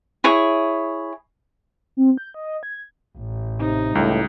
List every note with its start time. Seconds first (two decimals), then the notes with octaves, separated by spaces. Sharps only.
0.24 E4 G#4 C#5
1.97 C4
2.18 G6
2.34 D#5
2.63 G#6
3.17 A1
3.59 C3 D#4
3.95 C#2 A2 G3